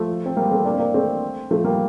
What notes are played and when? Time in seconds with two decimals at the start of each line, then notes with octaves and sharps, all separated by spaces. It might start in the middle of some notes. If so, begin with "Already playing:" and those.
Already playing: F3 A3
0.26 C4
0.36 G3 A#3
0.51 A3 C4
0.65 A#3 D4
0.74 C4
0.79 A#3 D4
0.94 A3 C4
1.51 F3 A3
1.64 G3 A#3